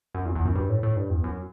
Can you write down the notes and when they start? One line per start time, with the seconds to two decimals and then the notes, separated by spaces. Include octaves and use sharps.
0.15 F#2
0.25 E2
0.35 E2
0.45 F#2
0.56 G2
0.69 A2
0.83 A2
0.96 G2
1.10 E2
1.24 F#2